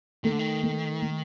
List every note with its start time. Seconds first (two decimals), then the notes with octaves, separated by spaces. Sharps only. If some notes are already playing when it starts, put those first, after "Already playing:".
0.24 D#3 A3
0.32 D3
0.39 D#3
0.63 A3
1.02 A3